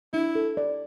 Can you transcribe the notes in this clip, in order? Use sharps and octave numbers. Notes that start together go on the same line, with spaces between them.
D4 E4
A4
D5